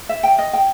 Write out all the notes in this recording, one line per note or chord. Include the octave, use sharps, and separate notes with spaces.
E5
G5
D#5
G5